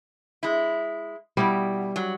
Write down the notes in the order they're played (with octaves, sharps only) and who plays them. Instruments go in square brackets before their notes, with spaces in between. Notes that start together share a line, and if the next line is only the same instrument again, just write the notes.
[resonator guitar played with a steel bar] G#3 E4
[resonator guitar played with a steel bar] B2 [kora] G3 E4 G5
[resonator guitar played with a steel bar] F#3